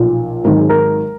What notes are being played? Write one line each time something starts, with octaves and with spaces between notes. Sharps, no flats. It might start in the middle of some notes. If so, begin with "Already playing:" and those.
Already playing: B1 A#2 F3
G#1 G#2 D#3 F#3 A#4
G#4
A#4